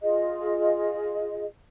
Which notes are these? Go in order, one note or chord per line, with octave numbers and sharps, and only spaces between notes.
F4 G#4 D#5